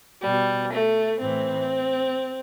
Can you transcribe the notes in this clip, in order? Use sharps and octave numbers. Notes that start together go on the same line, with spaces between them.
B2 G3
A3
A2 E3 C4